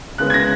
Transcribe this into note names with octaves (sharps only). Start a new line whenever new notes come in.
C#3 G#3 B3 F#6
G#6
A#6